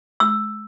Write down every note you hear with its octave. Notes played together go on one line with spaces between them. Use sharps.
E6